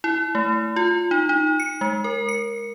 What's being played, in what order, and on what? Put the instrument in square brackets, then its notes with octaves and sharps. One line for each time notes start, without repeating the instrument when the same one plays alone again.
[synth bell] E4
A3
F4
D#4
D#4
C#7
G#3
A#4
C#7